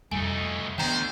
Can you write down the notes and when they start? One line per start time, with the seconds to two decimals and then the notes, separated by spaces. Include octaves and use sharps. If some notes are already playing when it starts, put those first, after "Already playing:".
0.11 F2 G3 A3 D#4 G#5
0.78 D2 E3 B3 C5 G5 A#5